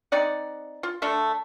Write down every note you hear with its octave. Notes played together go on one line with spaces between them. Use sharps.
C4 D#4 D5 F#5
F4
D3 A3 D4 A4